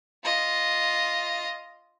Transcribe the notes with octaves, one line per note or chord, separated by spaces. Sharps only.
F4 D#5